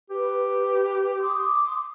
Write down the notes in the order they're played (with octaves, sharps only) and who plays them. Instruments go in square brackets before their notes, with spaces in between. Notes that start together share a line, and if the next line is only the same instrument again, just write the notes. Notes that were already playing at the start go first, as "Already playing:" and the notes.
[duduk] G4 [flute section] B4
[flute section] C6 D6 D#6